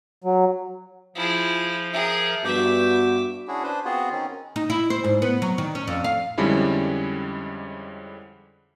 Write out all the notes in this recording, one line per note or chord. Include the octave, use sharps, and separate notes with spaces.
F#3
F3 E4 F4 G#4
G#4 A#4 E5
G2 B3 F#4 E5 D6 G6
C#4 D4 E4 F#4 G#4
D4 B4 C5
B3 C4 F4 F#4 G#4
D#3 C4 C#4
D#4
E4
C5
G#2
B3
F#3
D#3
C#4
F2
F5
F2 D3 G3 G#3 C#4 E4